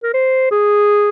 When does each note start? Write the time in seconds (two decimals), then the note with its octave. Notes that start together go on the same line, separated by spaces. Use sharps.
0.03 A#4
0.14 C5
0.51 G#4